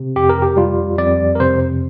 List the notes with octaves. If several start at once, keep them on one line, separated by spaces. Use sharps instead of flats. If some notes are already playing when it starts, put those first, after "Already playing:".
Already playing: C3
F2 G4
A#4
G4
G3 F4
F2 D5
A#4
C3 C5